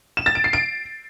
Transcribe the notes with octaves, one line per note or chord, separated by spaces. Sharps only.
E7
A6
D7
C7
D7